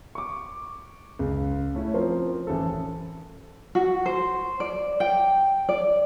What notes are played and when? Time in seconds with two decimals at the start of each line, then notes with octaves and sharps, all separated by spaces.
0.15 C#6 D6
1.19 C#2
1.75 A3 C#4 E4
1.94 F3 C4 A#4 C5
2.47 A1 A4
3.75 F#4
4.06 C5
4.60 D5
5.00 G5
5.69 D5